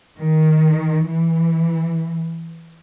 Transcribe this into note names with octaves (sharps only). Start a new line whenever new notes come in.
D#3
E3